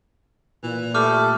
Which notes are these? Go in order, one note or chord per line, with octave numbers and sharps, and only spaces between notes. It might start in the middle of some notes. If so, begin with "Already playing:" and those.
A#2 E3
G3 A3 D6 F6